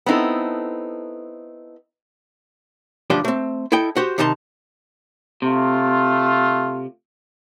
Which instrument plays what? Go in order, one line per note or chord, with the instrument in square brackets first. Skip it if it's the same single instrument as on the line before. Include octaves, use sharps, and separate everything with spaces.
[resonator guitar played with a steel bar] B3 C4 D#4 E4 A4
[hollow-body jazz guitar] D2 G2 F3 D4 G4 C6
A3 C4
E4 A4 D#5 G5
F#4 G4 C5
C3 D#3 D#4 A5 C6
[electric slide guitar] C3 [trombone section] A3 F4